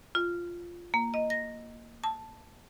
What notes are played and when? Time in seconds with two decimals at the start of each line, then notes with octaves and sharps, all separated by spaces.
0.15 F4
0.94 A#3
1.14 D#5
1.30 A#6
2.04 A5